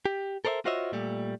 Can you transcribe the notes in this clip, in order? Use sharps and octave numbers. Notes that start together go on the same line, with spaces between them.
G4
A4 A#4 C5 D5 E5
F4 F#4 C5 C#5 D#5 E5
A#2 G3 A3